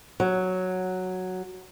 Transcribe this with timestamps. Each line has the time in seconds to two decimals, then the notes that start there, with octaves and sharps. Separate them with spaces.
0.20 F#3